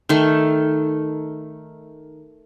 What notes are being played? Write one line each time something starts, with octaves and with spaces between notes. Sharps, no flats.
D#3 A3